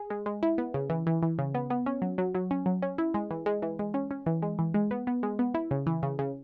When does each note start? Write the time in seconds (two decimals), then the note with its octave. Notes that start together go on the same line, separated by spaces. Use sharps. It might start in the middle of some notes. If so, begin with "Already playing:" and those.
Already playing: G#4
0.10 G#3
0.26 G#3
0.43 E4
0.58 B3
0.74 C#3
0.90 E3
1.07 E3
1.22 E3
1.39 C#3
1.55 B3
1.70 B3
1.86 C#4
2.02 F#3
2.18 F#3
2.35 F#3
2.51 C#4
2.66 F#3
2.82 C#4
2.98 E4
3.14 G#3
3.31 E3
3.46 G#3
3.62 E3
3.79 G#3
3.94 C#4
4.11 C#4
4.26 E3
4.42 G#3
4.59 E3
4.74 G#3
4.91 B3
5.07 B3
5.23 G#3
5.39 B3
5.54 E4
5.71 C#3
5.87 E3
6.03 C#3
6.19 C#3